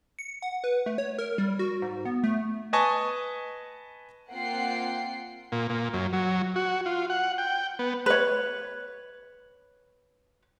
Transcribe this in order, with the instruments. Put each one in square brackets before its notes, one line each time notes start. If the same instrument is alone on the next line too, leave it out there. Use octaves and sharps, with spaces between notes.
[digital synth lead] C#7
F#5
B4
A3
C#5
A#4
G3
F#4
G#2
B3
A3
[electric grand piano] B4 D#5 G#5 A5 C#6
[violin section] A#3 C4 F4 F#5 G5 C7
[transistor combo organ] A#2
A#2
F#2
F#3
F#4
F4
F#5
G5
B3
[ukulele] B4 C#5